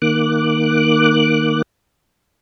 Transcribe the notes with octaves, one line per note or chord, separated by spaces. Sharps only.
D#3 A#3 D6 F#6